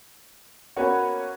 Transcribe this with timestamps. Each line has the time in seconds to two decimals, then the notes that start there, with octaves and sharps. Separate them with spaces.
0.76 A#3 B3 C#4 F#4 C#5